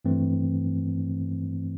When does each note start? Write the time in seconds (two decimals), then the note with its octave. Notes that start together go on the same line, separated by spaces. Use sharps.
0.05 G2 E3 A3 C4